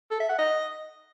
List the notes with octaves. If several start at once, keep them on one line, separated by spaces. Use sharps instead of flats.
A4
E5
F#5
D#5